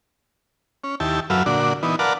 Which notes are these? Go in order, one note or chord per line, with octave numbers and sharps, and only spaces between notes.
C#4
D#2 E4 G4 A5
F#2 F#3 A4 B4 E5 F5
A#2 D3 D4 F#4
E3 B3 D#4
A#4 B4 D5 F5 F#5 A5